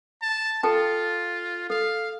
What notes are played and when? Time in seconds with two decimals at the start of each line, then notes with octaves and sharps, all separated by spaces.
0.22 A5
0.63 F4 A4 G5 A5
1.70 A4 F5